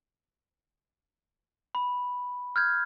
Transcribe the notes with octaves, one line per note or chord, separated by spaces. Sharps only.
B5
F6 G6 G#6